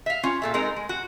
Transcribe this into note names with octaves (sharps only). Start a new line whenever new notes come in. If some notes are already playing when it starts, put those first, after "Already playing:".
E5 F5
C#4 F4
A#2 A4 E5
G#3 C4 D#4 A4 A#4
G#3
F#4